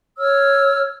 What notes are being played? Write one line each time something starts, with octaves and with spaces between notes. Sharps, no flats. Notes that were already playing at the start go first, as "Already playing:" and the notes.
C#5 E6 F6